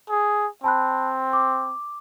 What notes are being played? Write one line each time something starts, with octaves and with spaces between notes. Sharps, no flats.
G#4
C4 A5 B5 F#6
D6